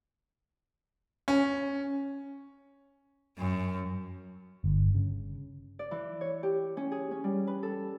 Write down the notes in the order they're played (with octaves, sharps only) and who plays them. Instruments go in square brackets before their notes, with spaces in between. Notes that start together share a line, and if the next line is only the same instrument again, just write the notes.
[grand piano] C#4
[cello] F#2
[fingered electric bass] G1
C#3
[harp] D5
E3
C#5
G4
C#4
G#4
C#4
G3
B4
A4